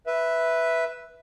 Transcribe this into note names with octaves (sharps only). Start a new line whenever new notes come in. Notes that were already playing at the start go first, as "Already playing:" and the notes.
B4 E5